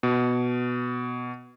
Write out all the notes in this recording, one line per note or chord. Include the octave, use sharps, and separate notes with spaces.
B2